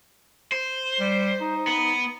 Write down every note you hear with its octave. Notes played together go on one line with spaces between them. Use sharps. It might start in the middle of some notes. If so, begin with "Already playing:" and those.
C5
G3
D#4
B3